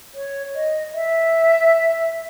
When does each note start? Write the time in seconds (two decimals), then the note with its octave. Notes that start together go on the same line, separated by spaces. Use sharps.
0.15 C#5
0.55 D#5
0.94 E5